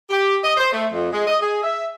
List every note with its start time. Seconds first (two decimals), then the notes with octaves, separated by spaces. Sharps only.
0.10 G4
0.44 D#5
0.57 C5
0.73 A3
0.93 F2
1.12 G#3
1.27 D#5
1.42 G#4
1.64 E5